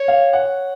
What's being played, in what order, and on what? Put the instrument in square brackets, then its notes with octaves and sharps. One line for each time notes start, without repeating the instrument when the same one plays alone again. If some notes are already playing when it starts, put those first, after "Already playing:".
Already playing: [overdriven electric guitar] C#5
[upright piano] F5
F#5